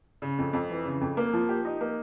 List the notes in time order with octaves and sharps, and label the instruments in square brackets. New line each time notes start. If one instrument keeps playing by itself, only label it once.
[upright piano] C#3
F2
F2
E3
C#3
F2
A#3
F3
G4
D#4
A#3